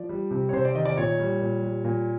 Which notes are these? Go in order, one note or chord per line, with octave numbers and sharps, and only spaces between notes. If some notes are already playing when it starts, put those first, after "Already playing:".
Already playing: F3 D5
G3
C3
C#5
C3 C5
D5
D#3 D#5
D5
A#2 C#5
G3
A#2
G3
A#2